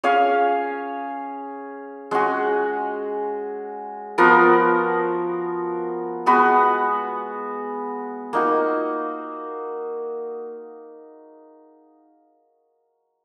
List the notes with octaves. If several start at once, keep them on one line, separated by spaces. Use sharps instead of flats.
C#4 G#4 C#5 F5
G#3 C#4 F#4
F3 B3 F#4 A#4
G#3 B3 F#4 B4
A#3 D#4 F#4